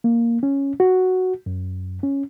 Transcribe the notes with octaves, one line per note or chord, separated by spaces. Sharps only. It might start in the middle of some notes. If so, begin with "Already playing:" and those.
A#3
C#4
F#4
F#2
C#4